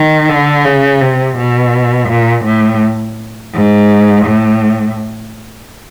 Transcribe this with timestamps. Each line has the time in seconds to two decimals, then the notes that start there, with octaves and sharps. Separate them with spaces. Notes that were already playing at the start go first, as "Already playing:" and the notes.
Already playing: D#3
0.29 D3
0.65 C#3
1.01 C3
1.37 B2
2.09 A#2
2.45 A2
3.53 G#2
4.25 A2